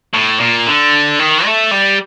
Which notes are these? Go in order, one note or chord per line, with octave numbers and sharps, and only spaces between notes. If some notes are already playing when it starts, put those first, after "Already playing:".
A2
A#2
D3
D#3
A3
G3